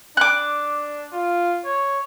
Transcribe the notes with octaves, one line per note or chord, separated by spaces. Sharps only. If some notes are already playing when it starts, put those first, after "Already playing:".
D4 D6 F#6
F4
C#5